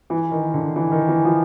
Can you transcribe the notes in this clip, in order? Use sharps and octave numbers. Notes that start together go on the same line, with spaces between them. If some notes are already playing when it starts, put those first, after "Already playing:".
E3
D#3
D3
E3
D#3
E3
F3